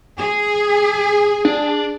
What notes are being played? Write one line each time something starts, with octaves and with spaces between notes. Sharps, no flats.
G#4
D4